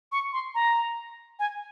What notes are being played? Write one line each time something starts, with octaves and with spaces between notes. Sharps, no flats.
C#6
C6
A#5
G#5